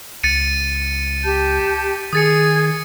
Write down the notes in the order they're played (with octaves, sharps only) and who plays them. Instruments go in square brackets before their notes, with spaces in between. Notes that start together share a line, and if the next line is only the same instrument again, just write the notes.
[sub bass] C#2 [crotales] A6 C#7 D#7
[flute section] G4 A5 G6
[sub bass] D#3 [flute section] G#4 G#6 [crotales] D#6 A6 C#7